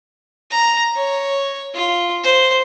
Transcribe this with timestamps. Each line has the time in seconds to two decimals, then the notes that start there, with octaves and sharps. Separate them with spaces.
0.51 A#5
0.96 C#5
1.74 F4
2.24 C5